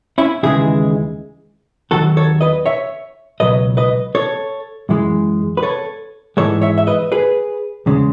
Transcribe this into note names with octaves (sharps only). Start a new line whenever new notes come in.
C#4 E4
D#2 C#3 E3 G#3 E4 G#4
D#2 D#3 F#3 F#4 A4
A4 C#5
B4 D#5
C#5 E5
C#2 B2 F#3 B4 D#5
B4 D#5
A4 C#5
F#2 E3 G#3
B4
A4 C#5
G#2 E3 G#3 A4 C#5
C#5 E5
E5
B4 D#5
G#4 B4
E2 C#3 G#3